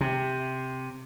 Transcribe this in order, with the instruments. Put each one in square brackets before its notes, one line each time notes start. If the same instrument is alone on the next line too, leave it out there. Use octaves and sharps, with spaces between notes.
[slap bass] C3